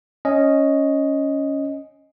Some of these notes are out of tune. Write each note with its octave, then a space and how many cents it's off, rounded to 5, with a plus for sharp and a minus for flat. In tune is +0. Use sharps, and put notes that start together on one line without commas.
C#4 +0 D#5 +0